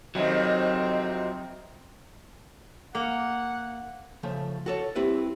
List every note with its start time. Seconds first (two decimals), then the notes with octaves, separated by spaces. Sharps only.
0.15 F2 C3 D#3 F#3 C4
2.95 A#3 F#5
4.23 C#3 F3 A3
4.66 F#4 A4 C#5
4.96 C4 E4 G4 B4